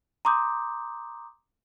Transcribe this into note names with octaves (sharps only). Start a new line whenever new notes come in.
A#5 C6 D6 D#6 G6